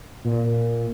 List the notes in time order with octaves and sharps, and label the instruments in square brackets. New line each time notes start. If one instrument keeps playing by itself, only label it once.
[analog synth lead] A#2